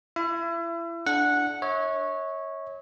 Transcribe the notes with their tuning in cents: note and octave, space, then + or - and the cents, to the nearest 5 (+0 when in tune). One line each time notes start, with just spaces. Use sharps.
E4 +30 E5 +35
D4 +0 A4 -45 F#5 -10
C#5 -10 E5 -45